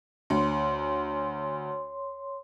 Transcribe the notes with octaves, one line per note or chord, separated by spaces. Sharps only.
D2 C#5 C6